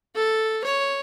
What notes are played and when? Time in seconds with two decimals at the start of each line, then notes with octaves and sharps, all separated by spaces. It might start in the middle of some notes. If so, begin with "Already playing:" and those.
0.16 A4
0.64 C#5